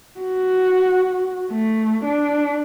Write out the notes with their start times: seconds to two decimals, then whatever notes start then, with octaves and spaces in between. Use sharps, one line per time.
0.20 F#4
1.51 A3
2.05 D4